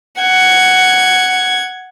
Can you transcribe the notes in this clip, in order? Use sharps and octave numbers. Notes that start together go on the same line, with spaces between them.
F#5 G#6